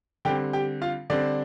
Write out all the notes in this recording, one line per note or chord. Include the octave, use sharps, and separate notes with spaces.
D3 G3 C4 G4 G5
G4 G5
F4 F5
D3 G3 C4 D4 D5